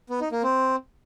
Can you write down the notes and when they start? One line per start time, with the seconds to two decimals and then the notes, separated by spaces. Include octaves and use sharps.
0.10 B3
0.21 D#4
0.32 A#3
0.43 C4